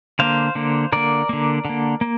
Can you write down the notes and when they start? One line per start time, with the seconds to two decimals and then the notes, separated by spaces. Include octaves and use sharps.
0.19 D3 A#3 C5 F5
0.55 D3 A#3
0.92 D3 A#3 A#4 D5
1.29 D3 A#3
1.65 D3 A#3
2.01 A#3